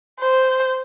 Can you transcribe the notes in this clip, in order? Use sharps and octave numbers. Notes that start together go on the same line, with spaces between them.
C5